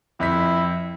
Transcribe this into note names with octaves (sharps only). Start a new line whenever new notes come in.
F2 E4 B6